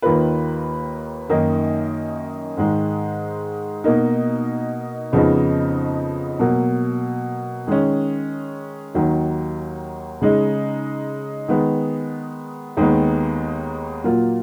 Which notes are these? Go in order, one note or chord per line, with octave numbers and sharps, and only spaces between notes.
D#2 D#3 A#3 F4 B4
F#2 D#3 A#3 D#4
G#2 D#3 G#3
B2 A#3 D#4
F2 C#3 F3 B3 D#4
B2 F#3 A#3
D#3 G#3 C#4
D#2 D#3 F#3
C#3 G#3 D#4
D#3 G#3 B3
D#2 D#3 G#3 B3
A#2 F#3 A#3 F4